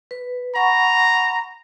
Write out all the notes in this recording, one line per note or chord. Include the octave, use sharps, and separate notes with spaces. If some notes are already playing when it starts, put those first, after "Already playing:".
B4
F#5 A#5 B5 C#6